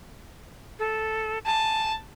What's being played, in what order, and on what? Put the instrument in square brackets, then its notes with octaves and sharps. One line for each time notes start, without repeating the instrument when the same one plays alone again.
[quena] A4
[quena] G#5 [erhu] A5